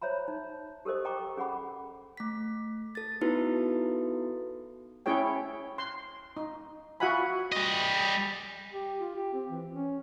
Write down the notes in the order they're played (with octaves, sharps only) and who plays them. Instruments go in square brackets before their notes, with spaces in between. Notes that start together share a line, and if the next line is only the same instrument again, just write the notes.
[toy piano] C5 C#5 E5 A#5 B5
D#4
G4 A4 A#4 C5 D#5
A4 D#5 G5 A#5 C#6 D6
C#4 G#4 F#5 B5 D6
[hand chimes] A3 B6
A4 A6
B3 D#4 E4 F#4 A4 B4
[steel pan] C#4 E4 G#4 C#5 G5
C6
D#4
F4 F#4 E5 F#5 G#5 B5
[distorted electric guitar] G3 D#5
[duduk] G4
F4
G4
C4
E3
C#4